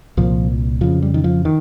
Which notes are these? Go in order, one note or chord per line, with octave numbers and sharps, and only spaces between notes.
C2 A#2 F3
F2 C#3 F3
G3
D#3
F3
D#3